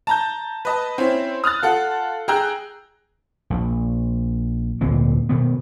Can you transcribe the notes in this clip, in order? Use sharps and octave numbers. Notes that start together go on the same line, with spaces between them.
A5 A#5 G6
B4 D#5 A5
C4 C#4 E4
D#6 F6 F#6 A6
F4 A4 F#5
G#4 G5 A#5 E6 F#6 G6
A#1
D2 A#2 E3 C4
B2 D#3 B3